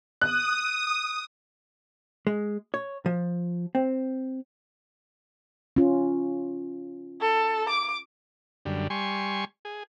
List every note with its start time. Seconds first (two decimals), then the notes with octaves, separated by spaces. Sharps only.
0.21 D#6 F#6
2.27 G#3
2.74 C#5
3.06 F3
3.75 C4
5.76 C#4 F4
7.21 A4
7.69 D6
8.65 F#2 D3 G3
8.90 G3 G#5 C6 C#6
9.65 G#4